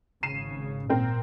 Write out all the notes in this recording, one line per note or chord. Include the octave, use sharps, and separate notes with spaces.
G#1 C#3 C7 D#7 E7
A#2 C4 A#4